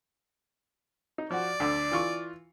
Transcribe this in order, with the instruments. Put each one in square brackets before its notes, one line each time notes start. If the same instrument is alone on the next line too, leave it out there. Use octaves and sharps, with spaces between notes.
[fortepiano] D#4
[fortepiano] F3 F#4 [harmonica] D5
[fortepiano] D2 D3
E3 F4 C#6